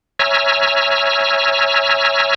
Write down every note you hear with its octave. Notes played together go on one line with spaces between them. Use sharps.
C#5 E5 G#5 A#5 E6 F6